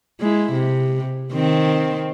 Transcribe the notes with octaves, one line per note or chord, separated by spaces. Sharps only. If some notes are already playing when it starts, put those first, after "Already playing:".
G#3 E4
C3
D#3 C4